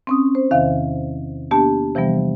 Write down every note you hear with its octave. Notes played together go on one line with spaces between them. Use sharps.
C4 C#4 D#6
C5
E2 C3 D#3 E5 F5
A#3 B3 D4 G4 A5
C3 E3 F3 G3 B3